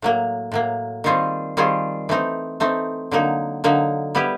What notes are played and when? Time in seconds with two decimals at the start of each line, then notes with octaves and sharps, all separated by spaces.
0.02 A2 F#3 A#3
0.52 A2 F#3 A#3
1.04 D#3 G3 C4 F4 G#4
1.57 D#3 G3 C4 F4 G#4
2.09 E3 A3 C4 D#4
2.60 E3 A3 C4 D#4
3.11 D3 F#3 A#3 D#4
3.64 D3 F#3 A#3 D#4
4.15 G3 B3 E4 G4